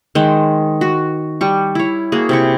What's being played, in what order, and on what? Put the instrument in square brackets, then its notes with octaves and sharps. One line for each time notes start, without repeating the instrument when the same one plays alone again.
[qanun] D#3 G#3 C5 F#5
F#4
G3 C#6
E4 C#5
A#3 F#4 G#4
C3 E4 C#6